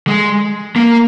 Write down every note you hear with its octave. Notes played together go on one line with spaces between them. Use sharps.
G#3
A#3